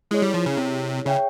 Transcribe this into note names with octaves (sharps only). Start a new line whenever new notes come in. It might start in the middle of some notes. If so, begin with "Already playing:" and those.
G#3 E4 G#4 C#5
G3
F3
C#3
C3
C#3 G#4 C#5 E5 G5